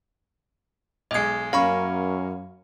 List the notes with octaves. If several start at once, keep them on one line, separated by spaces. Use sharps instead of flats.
B1 G#3 D#5 G#6
F#2 A#3 C#4 F5 B5 C#6